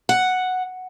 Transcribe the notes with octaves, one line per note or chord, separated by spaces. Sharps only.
F#5